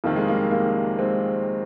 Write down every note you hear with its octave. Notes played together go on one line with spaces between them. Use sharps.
F2 C3 D#3 A#3
G#3
G3 A#3
G3 A#3
G#3 C4